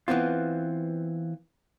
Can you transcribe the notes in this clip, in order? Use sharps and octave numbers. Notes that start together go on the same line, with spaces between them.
E3 B3 C4 F4